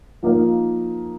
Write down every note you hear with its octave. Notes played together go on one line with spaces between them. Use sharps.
F3 A#3 D#4 A#4 F5